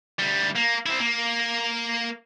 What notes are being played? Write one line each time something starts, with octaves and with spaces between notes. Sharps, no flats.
D2 G3
A#3
C4 E4
A#3